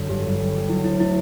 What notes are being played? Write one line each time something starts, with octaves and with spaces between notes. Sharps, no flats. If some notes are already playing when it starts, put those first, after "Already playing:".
Already playing: F#2 D3
G1 G4
G1
G3
G3
F#3 E4
D2 E4
A3 E4